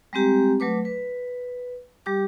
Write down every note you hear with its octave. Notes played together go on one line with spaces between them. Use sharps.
G3 G#3 C4 G4 A#5
F#3 A3 B4 D6
B4
G3 G4 D6